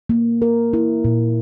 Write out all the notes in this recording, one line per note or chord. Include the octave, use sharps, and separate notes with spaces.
A#3
A#4
E4
A#2